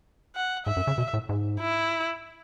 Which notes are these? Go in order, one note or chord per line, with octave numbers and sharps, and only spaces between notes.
F#5
G#2 E5
F#2
C#3
B2
A2
G#2
E4